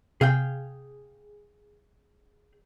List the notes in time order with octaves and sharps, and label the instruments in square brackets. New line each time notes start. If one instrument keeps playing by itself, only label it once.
[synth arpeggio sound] C3 [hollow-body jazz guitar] G#4 F5 G5